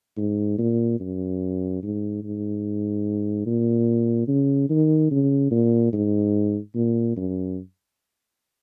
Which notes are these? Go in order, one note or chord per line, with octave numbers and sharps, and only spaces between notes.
G#2
A#2
F#2
G#2
G#2
A#2
C#3
D#3
C#3
A#2
G#2
A#2
F#2